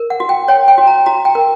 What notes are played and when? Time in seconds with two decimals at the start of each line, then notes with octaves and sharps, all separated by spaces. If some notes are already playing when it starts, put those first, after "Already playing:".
Already playing: A#4
0.10 F#5
0.20 F#4
0.29 G5
0.48 C#5 G5
0.68 G5
0.78 F#4
0.87 A#5
1.06 F#4 A#5
1.25 G5
1.35 A#4